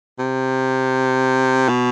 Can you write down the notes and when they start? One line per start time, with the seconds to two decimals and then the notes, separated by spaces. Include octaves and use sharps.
0.19 C3
1.69 B2